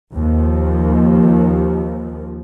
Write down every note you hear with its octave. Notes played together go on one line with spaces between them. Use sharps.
D#2 F3